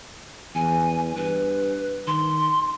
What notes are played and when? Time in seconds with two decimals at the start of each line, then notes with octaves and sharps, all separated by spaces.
0.55 E2 G#5
1.16 G2 B4
2.07 D#3 C6